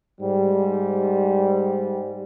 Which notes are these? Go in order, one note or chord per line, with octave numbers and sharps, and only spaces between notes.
G#2 G3